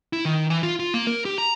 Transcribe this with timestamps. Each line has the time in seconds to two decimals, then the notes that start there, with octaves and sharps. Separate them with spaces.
0.13 E4
0.25 D#3
0.50 E3
0.63 F4
0.80 F4
0.94 A#3
1.07 A#4
1.25 G4
1.38 A#5